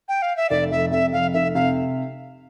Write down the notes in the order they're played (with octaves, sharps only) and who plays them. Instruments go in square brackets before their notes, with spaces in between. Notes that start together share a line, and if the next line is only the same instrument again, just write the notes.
[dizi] G5
F5
E5
[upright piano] F1 [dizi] D5
[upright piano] F2 [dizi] E5
[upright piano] C3 [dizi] E5
[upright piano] F2 [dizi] F5
[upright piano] F1 [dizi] E5
[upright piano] C3 [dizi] F5